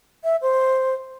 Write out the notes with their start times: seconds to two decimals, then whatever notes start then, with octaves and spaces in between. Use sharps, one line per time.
0.24 E5
0.42 C5